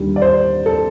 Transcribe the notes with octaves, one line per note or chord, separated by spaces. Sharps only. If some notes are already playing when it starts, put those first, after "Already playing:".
Already playing: D#2 D3 G3
D5
C5
A4